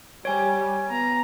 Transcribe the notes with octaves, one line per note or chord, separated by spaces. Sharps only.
G3 C#5 G#5
B3 A#5